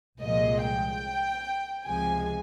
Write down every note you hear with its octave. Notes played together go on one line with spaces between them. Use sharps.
C2 A#2 F3 G#3 D#5
G5
C#2 C3 F3 G#3 G#5